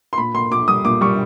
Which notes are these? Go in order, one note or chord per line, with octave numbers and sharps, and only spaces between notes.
C6
A#2 B5
A#2 C6
A#2 D6
G3 D#6
A#2 D6
G3 C#6